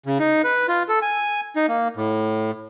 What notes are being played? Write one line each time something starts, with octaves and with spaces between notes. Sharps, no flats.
C#3
D#4
B4
F4
A4
G#5
D#4
A#3
A2